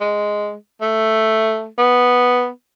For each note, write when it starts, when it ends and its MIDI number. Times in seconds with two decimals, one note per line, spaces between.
0.01 0.55 56
0.81 1.68 57
1.78 2.50 59